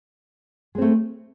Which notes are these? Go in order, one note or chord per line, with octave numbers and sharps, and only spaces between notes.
G#3 A3 C4